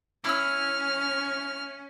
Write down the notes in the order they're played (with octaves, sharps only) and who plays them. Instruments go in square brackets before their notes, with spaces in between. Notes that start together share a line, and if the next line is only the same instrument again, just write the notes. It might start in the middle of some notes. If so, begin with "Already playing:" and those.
[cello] C#4 [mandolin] E4 E6 [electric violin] F6